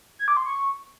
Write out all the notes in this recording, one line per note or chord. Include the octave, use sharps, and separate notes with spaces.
G#6
D6
C6
C#6